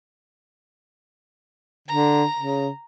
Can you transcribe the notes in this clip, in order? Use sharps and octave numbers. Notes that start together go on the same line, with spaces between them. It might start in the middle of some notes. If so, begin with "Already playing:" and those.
D3 A#5
C#3